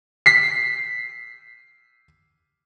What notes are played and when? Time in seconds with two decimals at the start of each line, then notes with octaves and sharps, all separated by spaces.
0.26 B6 C7